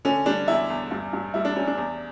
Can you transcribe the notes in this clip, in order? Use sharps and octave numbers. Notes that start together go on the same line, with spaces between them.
D3 C#4
G3 D4
E2 E4
E2
G2
G2
G3 E4
D4
G3 C#4
D4
E2